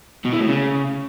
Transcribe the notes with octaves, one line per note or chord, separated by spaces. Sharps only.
B2
E3
A2
C#3